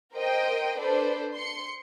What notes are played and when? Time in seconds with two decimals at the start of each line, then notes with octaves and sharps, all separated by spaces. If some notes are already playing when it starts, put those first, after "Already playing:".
0.15 A#4 C5 D#5 G5
0.78 D4 A4 B4 C5
1.34 C6 C#7